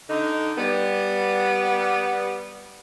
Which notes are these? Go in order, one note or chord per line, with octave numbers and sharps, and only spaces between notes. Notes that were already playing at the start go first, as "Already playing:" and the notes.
D3 D#4
G3 B3